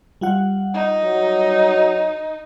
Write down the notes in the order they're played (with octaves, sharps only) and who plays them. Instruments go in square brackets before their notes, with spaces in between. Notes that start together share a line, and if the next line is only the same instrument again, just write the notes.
[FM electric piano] G3 F4 F#5
[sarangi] D#4
[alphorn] F#3